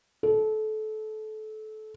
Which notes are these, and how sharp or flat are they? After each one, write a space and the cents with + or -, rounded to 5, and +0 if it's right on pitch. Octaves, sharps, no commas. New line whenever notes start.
A4 -25